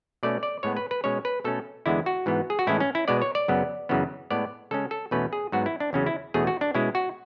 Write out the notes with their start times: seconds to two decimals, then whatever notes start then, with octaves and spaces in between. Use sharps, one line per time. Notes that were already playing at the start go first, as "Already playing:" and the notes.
0.23 B2 A3 C#4 D5
0.43 D5
0.63 A2 G#3 B3 C#5
0.77 B4
0.91 B4
1.04 B2 G#3 C#4 C#5
1.25 B4
1.44 B2 A3 C#4 A4
1.86 E2 D3 G#3 B3 E4
2.06 F#4
2.26 G#2 E3 B3
2.50 G#4
2.59 F#4
2.67 A2 E3 G#3 C#4 E4
2.80 C#4
2.95 E4
3.08 B2 G#3 B3 D5
3.22 C#5
3.35 D5
3.48 F#2 C#3 F#3 B3
3.89 F#2 C#3 E3 B3
4.30 A2 G#3 B3 D5
4.71 C#3 G#3 C#4 A4
4.91 A4
5.11 E2 B2 A3 C#4 B4
5.33 G#4
5.52 G#2 F#3 B3 F#4
5.66 E4
5.80 D4
5.93 E2 C#3 F#3 C#4
6.06 E4
6.34 E2 B2 A3 C#4 G#4
6.47 F#4
6.61 D4
6.74 B2 G#3 C#4 E4
6.95 F#4